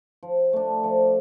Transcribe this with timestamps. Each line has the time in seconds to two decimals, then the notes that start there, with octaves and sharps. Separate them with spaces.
0.23 F3
0.53 A3 D4
0.84 F3